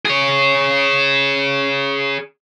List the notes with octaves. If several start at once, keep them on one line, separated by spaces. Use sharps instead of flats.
G#4 C#5